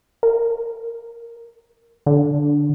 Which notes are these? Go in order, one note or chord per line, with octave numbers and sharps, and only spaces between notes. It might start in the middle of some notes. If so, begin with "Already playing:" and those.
A#4
D3